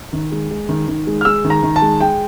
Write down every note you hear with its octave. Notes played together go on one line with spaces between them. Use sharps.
D#3
G#3
G#3
D#3
D#3
G#3
F6
G#3 E6
D#3
A#5
D#3
A5
G#3
G#3 G5